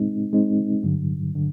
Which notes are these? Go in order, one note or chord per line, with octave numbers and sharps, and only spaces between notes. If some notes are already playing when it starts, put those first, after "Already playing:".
Already playing: G#3 C4 D#4
G#3 C4 D#4
G2 D3 F#3
D3